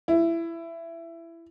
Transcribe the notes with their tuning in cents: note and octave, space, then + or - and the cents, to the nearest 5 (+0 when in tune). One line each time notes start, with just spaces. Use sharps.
E4 +20